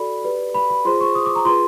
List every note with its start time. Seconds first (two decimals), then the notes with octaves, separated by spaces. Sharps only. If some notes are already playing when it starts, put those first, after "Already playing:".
Already playing: F#4 A4 D5 B5
0.24 G4 B4 D5
0.54 B5
0.70 B5
0.85 F4 G#4 C5 C6
1.01 C#6
1.15 D#6
1.26 D6
1.36 A#5
1.45 F4 G#4 B4 C6